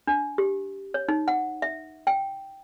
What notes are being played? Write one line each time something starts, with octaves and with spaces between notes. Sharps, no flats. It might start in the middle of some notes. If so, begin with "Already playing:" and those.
D4
G4
C#5
D#4
F#5
E5
G5